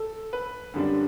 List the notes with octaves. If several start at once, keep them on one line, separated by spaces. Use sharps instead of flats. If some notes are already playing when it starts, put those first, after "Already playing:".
Already playing: A4
B4
F#2 D3 G3 D4